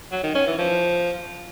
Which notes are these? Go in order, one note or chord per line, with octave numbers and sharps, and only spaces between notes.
F#3
D#3
C#4
E3
F3